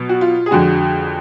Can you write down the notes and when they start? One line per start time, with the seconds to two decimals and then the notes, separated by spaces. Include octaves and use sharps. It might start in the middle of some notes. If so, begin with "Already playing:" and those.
Already playing: B2 F#3
0.09 F#4
0.21 F4
0.46 G#4
0.51 F2 D3 G#3 F#4